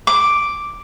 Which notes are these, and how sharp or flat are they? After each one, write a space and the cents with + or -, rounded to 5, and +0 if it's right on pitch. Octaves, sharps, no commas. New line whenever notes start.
D6 +0